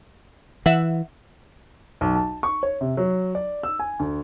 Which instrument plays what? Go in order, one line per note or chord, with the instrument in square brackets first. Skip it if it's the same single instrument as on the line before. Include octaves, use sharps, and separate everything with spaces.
[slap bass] E3 [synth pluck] E5 F#5
[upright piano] B1
A5
C#6
C#5
C3
F#3
D5
E6
G#5
D2